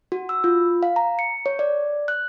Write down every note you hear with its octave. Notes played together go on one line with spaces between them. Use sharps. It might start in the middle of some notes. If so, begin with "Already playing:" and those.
F#4
E6
F4
F5
A#5
C#7
C#5
D5
F#6